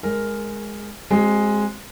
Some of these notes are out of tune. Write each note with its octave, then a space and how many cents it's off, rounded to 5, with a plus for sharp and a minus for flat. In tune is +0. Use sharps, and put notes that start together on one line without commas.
G#3 +0 A#4 +0
G#3 +0 C4 +15 F#4 +40